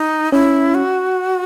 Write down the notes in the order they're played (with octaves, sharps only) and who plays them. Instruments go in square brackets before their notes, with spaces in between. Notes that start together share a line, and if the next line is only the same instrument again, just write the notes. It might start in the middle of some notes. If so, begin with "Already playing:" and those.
Already playing: [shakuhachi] D#4
[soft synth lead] C#4 [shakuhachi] E4
[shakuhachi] F#4